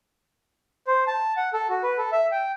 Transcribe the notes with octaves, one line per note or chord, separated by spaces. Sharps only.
C5
A5
F#5
A4
F#4
B4
A4
E5
G5